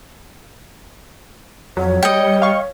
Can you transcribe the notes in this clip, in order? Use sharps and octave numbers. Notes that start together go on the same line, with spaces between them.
F2 F#3 C#5
G3 D#5 G5 C#7
F5 C#6